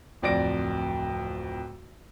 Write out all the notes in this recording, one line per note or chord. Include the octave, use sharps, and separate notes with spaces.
D1 F2 D5 A#6 D7